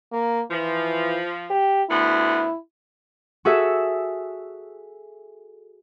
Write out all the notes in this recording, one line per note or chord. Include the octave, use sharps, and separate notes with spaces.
A#3
E3 F3
G4
D2 B3 E4
F#4 G#4 A4 E5